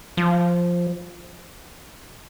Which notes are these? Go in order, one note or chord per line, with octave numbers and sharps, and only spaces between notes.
F3